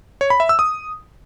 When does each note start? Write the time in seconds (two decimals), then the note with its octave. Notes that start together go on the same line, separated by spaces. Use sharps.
0.21 C#5
0.30 B5
0.40 E5
0.49 E6
0.59 D#6